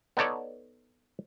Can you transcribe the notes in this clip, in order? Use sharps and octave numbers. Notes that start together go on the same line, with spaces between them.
B3 D#4 A4 C#5 D5